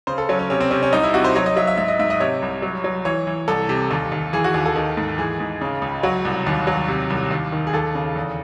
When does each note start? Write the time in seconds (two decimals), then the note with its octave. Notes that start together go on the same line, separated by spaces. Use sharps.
0.07 C#3 C5
0.18 A4
0.29 F#3 C#4
0.39 C#4
0.50 C3 C#4
0.60 C4
0.71 C3 C#4
0.83 C#4
0.92 C2 D#4
1.03 E4
1.14 C3 F#4
1.24 C5
1.36 F#3 C#5
1.46 D#5
1.56 F#3 E5
1.67 E5
1.78 G#2 E5
1.88 D#5
1.99 G#2 E5
2.10 D#5
2.20 C3 C#5
2.42 C2
2.62 F#3
2.84 F#3
3.05 E3 C#5
3.27 E3
3.48 C2 A4
3.69 C3
3.91 D#2
4.12 D#2
4.33 E3 G#4
4.44 F#4
4.54 D#2
4.66 A4
4.76 D#3
4.97 G#2
5.18 E3 G#4
5.40 G#2
5.61 C#3
5.82 C#2
6.03 F#3 F#4
6.25 C2
6.47 D#2
6.67 F#3
6.88 C3
7.10 C2
7.31 D#2
7.52 D#3
7.67 G#4
7.73 D#2 A4
7.95 C#3
8.16 E2